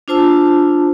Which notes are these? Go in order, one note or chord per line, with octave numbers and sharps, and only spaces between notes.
D4 F4 C5 A5 E6